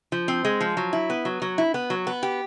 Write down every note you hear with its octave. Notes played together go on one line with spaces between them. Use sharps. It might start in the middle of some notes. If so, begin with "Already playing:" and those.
F3
C4
G#3
F3
F#3
E4
B3
F#3
F#3
E4
B3
F#3
B3
G4